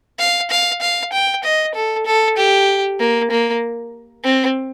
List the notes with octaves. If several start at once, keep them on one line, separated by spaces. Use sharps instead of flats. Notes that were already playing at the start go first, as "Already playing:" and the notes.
F5
F5
F5
G5
D#5
A4
A4
G4
A#3
A#3
C4